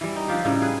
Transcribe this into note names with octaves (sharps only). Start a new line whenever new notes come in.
E3 G3
D#4
D3 F3 F4 G4
A2 C#3 G3 D#4
G#4 B4